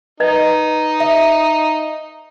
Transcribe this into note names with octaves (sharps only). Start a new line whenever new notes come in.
D#4 B4 D#5
E5